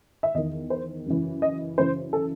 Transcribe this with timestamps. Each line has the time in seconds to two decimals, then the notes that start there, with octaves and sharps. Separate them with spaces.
0.23 E5
0.35 E2 D#3 D#5
0.70 C5
1.06 F#2 C#3 E3
1.42 D#5
1.78 F#2 C#3 E3 C5
2.13 A4